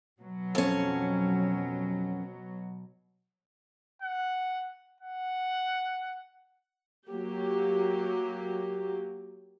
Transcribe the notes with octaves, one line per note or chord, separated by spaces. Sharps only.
B2 F#3
F2 C#4
F#5
F#5
F#3 A#3 G4